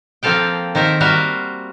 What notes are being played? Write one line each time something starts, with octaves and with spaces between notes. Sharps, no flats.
F3 A#3 C4 A4 F5 G5
D#3 C4 A#4 E5
G3 F#4 A#4 C5 E5 F5